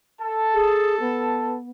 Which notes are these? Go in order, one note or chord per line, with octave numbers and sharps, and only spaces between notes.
A4 A5
G#4
B3